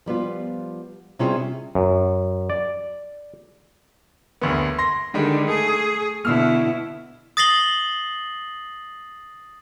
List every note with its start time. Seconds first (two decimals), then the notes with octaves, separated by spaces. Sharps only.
0.06 F3 G3 B3 F4
1.19 C3 G3 C#4 E4 F4 G#4
1.75 F#2
2.50 D5
4.41 F#1 D2 B3
4.79 C6 A#6
5.14 D3 D#3 G3 G#3
5.48 A3 G#4
6.25 B2 D3 E4 E6 F6
7.37 D#6 A6 A#6 C7 F#7 G7